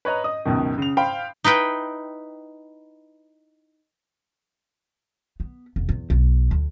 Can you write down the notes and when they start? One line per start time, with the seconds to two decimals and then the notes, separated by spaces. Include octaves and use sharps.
0.05 B4 C#5 D#5 A#5
0.24 D#5 D#6
0.45 C#2 F#2 B2 D#3
0.78 C#3 F7
0.97 C5 F5 G5 B5
1.44 D#4 E4 B4 G5
5.40 B3
5.76 E1
5.89 E2
6.10 B1
6.51 D2